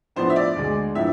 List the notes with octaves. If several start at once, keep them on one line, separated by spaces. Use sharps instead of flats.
A2 F3 B3 D4 C5
E5
D5
D2 D3 G#3
A2 F3 B3 D4 E5